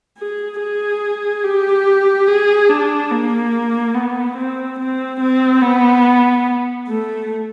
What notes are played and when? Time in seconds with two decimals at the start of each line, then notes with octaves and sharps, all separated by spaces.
0.18 G#4
0.60 G#4
1.43 G4
2.27 G#4
2.69 D4
3.11 A#3
3.94 B3
4.36 C4
4.79 C4
5.20 C4
5.62 B3
6.88 A3